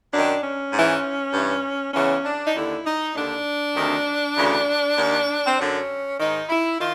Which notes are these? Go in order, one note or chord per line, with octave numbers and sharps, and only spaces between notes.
F#2 D#3 D4
C#4
G#2 E3
G2 E3
E2 C#3 E3 C#4
D4
D#4
D#2 D3 E4
D#4
D#2 D3 D4
D2 C3 D#3
D2 C#3 E3
D#2 D#3
C4
F#2 D3 C#4
G#2 D#3 D#4
E4
D#3 F4